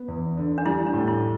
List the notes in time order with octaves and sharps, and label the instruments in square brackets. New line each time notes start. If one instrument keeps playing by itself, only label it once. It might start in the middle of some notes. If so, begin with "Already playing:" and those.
Already playing: [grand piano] B3
E2
D3
[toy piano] D4
[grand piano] G3 [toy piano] E4
[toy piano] D4
[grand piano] A2
[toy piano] E4